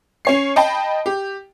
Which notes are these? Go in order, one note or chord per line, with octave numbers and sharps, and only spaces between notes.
C#4 C#5 C7
D#5 G5 A5 B5
G4